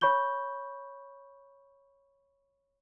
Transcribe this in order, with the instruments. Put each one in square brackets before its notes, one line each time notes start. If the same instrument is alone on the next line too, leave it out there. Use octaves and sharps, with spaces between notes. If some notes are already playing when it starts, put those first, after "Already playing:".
[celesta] C#5 B5 C#6 G6 G7